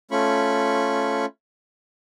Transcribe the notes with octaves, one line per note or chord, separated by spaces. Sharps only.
A3 C#4 F4 B5 C#6